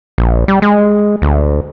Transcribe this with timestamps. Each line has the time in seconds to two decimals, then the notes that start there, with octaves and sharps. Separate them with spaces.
0.18 A#1
0.48 G3
0.62 G#3
1.22 D2